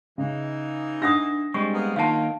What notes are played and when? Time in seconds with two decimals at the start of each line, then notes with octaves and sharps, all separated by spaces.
0.18 C#3 E3 D#4
1.02 D4 F#5 D#6 A#6
1.54 G3 G#3 C4 C#6
1.73 A#3 B3
1.96 D#3 F#3 A#3 D#4 F4 F5 A5